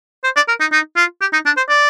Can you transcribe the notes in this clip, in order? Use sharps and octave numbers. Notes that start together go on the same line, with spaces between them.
C5
D5
A#4
D#4
D#4
F4
G4
D#4
D4
C5
D5